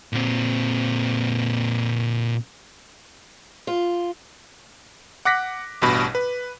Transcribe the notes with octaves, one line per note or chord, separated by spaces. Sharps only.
A#2 C4
F4
F#5 D6 F#6 A#6 B6
A1 G2 B2 B5
B4